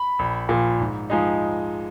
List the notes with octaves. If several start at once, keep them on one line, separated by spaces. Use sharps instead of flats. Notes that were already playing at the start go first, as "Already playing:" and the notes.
Already playing: B5
A#1
A#2 F3
G#2
F3 G#3 D#4